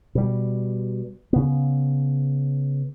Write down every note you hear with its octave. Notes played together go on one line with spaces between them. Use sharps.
B2 G3
C#3 B3